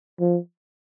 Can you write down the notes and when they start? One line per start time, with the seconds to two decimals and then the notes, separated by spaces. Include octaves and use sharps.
0.20 F3